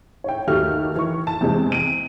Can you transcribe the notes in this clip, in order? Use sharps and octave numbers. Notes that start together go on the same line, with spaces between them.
C#5 G5
D#2 A3 F#4 G4 F6
E3 C#6
A5
E2 C3 G#3 C4
D7 D#7